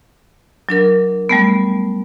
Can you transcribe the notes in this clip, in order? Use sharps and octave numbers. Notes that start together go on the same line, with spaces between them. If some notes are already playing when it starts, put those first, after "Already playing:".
F#3 D4 A#4
G3 A3 B3